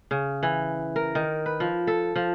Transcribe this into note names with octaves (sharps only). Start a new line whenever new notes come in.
C#3
E3
A#4
D#3
B4
F3
A4
F3